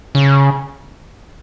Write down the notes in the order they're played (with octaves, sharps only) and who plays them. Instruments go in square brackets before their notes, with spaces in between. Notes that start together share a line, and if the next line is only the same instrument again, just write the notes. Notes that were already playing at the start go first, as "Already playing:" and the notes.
[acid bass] C#3